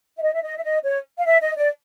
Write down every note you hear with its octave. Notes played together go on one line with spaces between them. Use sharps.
E5
D#5
E5
D#5
E5
D#5
C#5
F5
E5
D#5
D5